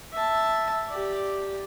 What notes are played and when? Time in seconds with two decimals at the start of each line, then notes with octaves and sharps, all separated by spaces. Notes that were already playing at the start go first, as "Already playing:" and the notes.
0.13 E5 A5
0.89 G4 D5